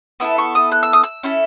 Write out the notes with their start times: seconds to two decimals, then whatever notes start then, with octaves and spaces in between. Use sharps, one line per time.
0.20 B3 E4 A4 E6
0.38 C#6
0.55 D#6
0.72 F#6
0.83 E6
0.93 D#6
1.03 E6
1.23 C#4 E4 A4